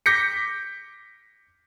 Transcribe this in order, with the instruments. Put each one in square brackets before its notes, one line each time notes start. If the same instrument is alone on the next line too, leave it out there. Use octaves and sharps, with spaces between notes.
[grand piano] D6 G6 A#6 B6 C#7